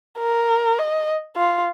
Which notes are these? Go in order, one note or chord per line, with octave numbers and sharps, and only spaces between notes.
A#4
D#5
F4